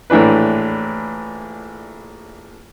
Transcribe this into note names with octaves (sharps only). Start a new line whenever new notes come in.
A#1 A2 E3 D4 B4